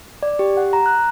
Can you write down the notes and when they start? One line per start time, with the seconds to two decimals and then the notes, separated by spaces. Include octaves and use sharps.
0.23 D5
0.39 G4
0.57 F#5
0.73 A#5
0.86 F#6